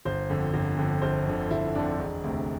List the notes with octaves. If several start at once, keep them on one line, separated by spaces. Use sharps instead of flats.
G1 C5
F2 D3
G1
F2 D3
G1 C5
F2 D3
G1 E4
F2 D3 D4
E1
D2 C3